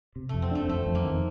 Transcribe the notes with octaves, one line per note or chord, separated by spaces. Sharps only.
C3
F2 A3
C4
A3 D4
F2 A3
F2
A#3
D#3